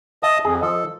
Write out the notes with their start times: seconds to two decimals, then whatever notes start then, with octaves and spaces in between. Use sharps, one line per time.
0.23 D#5 E5 A5 D#6
0.45 F2 G#4
0.61 F3 A4 D#5